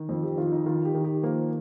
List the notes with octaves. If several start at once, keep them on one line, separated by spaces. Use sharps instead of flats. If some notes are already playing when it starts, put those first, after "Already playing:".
Already playing: D#3
F2 C4
G4
D#3 F4
D#4
D#3 F4
G4
D#3
G4
F3 A#3